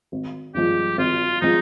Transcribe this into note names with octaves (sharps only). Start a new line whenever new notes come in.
G#1
G2 F3 G#3 G4
G#1 F4
F3 G#3 D#4